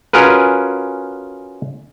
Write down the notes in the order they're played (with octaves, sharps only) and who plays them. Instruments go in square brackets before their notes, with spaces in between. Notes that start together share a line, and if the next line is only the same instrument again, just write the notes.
[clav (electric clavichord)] C#4 F4 F#4 G#4 A#4 B4